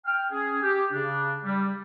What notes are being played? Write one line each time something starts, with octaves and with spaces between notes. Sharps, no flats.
G5 F6
C#4 G#4
G4
C#3 D4
G3